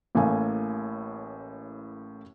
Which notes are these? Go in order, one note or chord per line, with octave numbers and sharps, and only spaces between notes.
A1 A2 A#3 G#5